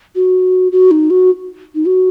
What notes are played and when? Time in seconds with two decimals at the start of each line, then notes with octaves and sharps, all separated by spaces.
0.15 F#4
0.72 F#4
0.91 D#4
1.10 F#4
1.75 D#4
1.87 F#4